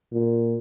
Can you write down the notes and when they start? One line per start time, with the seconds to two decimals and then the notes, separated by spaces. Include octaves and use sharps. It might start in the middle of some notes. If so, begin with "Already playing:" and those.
0.13 A#2